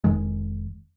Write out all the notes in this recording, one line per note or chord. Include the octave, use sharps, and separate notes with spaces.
F1 F2 D#3 G#3